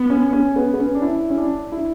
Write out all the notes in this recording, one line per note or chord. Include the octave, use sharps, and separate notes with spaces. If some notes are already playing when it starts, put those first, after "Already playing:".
Already playing: B3
C#4
C#4
B3
B3
C#4
D4
E4
C#4
D4
E4